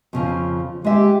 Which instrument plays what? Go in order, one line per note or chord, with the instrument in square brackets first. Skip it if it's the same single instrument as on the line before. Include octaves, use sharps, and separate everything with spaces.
[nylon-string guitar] F2 C#3 F3
[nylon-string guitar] G#3 E5 [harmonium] G4